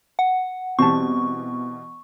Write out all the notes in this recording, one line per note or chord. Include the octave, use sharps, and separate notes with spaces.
F#5
B2 E3 G3 C4 A5 C#6